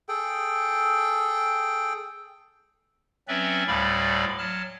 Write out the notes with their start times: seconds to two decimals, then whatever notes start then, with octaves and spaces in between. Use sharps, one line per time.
0.09 G#4 A4 G5
3.28 F#3 C4 C#4 B4 D5 E5
3.67 D2 A2 G3 D5 F5 B5
4.38 F#3 A5 F6